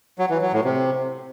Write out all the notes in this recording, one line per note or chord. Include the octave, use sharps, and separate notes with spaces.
F#3
E3
F#3
A2
C3